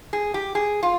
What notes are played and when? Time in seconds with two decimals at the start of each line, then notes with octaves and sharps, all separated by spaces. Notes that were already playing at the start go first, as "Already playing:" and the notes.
0.13 G#4
0.34 G4
0.55 G#4
0.83 F4